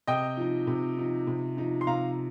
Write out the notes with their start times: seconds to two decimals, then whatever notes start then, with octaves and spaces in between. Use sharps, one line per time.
0.07 C3 D#5 G5
0.37 F3 D#4
0.67 C3
0.98 F3 D#4
1.27 C3
1.57 F3 D#4
1.81 C6
1.87 C3 F5 A#5